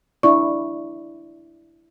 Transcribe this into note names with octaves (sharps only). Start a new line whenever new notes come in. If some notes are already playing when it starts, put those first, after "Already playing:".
D4 E4 D5 C#6